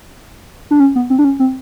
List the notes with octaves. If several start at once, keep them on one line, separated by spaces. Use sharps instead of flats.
D4
C#4
B3
C4
D4
C#4
C4